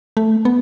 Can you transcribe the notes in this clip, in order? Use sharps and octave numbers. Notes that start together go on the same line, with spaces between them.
A3
B3